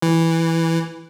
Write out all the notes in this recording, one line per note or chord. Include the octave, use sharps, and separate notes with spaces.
E3